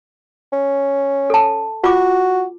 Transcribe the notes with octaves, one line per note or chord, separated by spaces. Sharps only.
C#4
A4 A5
F4 F#4 D6